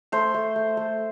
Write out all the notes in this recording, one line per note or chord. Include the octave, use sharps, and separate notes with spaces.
A3 C5
A3
A3
A3